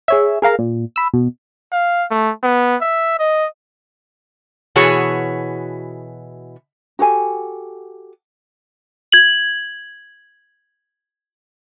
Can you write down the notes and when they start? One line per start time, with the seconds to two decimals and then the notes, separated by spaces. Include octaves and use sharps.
0.08 G#4 C#5 E5
0.42 G#4 A#4 F5 A#5
0.59 A#2
0.96 B5 E6
1.14 B2
1.72 F5
2.11 A3
2.43 B3
2.81 E5
3.19 D#5
4.76 B2 E3 F#4 G#4 C#5 A5
6.99 F#4 G4 A4 G#5
9.12 G#6 F#7